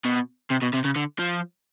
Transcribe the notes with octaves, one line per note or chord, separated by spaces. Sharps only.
B2
C3
B2
C3
C#3
D3
F3